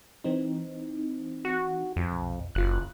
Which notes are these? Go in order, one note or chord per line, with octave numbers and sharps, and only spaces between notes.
E3 C4 D#4
F#4
F2
B1
F#1 F4 F#6